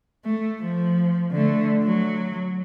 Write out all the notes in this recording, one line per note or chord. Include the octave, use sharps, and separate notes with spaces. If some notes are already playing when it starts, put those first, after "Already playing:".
A3
F3
D3 A3
F#3